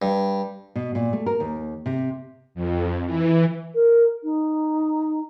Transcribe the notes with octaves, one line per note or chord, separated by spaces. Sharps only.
G2
B2
A#2
A3
A#4
D#2
C3
F2
E3
A#4
D#4